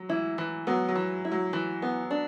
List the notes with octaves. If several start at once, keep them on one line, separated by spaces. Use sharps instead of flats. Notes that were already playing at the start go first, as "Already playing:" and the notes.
Already playing: F#3
E3 E4
E3
F#3 B3
F#3
E3
E4
F#3
E3
B3
D4